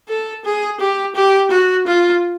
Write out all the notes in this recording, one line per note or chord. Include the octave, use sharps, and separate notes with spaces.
A4
G#4
G4
G4
F#4
F4